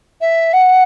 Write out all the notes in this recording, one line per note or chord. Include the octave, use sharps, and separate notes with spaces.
E5
F#5